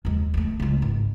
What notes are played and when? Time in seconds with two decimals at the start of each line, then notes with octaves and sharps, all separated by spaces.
0.05 D#2 G#3
0.34 G#3 A3
0.60 C#2 G#3
0.82 G#1